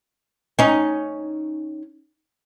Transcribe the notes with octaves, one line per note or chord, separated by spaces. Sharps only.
C#4 D#4